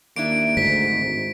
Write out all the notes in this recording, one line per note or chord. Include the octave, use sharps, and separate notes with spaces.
D#2 A#3 D4 E4 D7
D2 G#2 B6
G#1